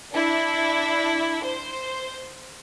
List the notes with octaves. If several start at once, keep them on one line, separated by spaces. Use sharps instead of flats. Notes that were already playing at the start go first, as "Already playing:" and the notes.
D4 E4
C5